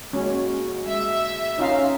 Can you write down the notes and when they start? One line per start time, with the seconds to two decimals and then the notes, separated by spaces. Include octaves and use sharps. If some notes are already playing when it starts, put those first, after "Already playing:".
0.13 G#3 A#3 C#4 F#4
0.87 G#3 E5
1.59 C#4 D#4 F4 F5